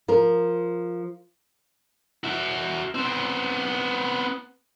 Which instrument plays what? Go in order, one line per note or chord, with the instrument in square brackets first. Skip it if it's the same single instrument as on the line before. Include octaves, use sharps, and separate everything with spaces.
[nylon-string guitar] F3 A#4
[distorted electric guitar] F#4 E5
B3 C4